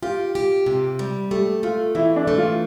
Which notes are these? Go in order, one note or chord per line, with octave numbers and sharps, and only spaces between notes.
F4 G4
G4
C3
G3
A3 G4
A3 F4
E3 E4
D4
A3
F4